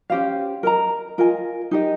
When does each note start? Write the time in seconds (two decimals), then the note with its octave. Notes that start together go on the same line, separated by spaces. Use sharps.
0.10 C#4 G4 C5 F5
0.63 A#4 D#5 A#5
1.18 F4 A#4 D#5 G#5
1.71 D#4 G4 A#4 D#5